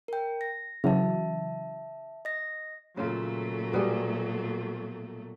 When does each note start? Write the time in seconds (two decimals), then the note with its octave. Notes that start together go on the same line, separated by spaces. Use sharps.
0.08 A#4 G5
0.41 A#6
0.84 C#3 E3 F#3 E5 A5
2.25 D#5 A#6
2.97 A#2 C#3 F#3 A3 F4
3.73 B2 G3 G#4